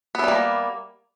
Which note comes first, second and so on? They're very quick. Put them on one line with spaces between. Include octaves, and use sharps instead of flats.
B3 E4 G3 A#3